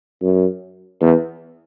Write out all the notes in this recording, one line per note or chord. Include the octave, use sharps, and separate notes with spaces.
F#2
E2